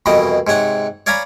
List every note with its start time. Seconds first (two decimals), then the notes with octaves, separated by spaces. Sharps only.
0.06 C2 F2 B2 E3 D#5 G5
0.47 G#2 C3 C#5 F#5
1.06 C#5 D5 F5 G#5 A#5 B5